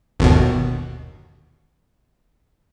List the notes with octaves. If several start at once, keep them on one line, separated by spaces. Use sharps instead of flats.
G1 D#2 B2